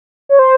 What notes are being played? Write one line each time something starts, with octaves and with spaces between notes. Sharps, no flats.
C#5
C5